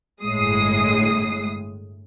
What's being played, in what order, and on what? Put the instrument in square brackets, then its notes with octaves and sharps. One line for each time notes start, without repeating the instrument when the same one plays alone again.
[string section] G1 A2 G#3 D#6 C7